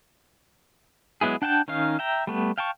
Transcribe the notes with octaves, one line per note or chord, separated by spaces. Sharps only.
F#3 G#3 B3 E4 G#4
D4 F#5 G5 A5 G6
D#3 C#4 D#4 F5
E5 G5 A#5
G3 A3 B3
F5 G5 A5 C#6